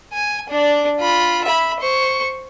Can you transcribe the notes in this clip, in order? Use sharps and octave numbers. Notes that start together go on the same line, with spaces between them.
G#5
D4 D5
F4 B5
E5 B5
C5 C#6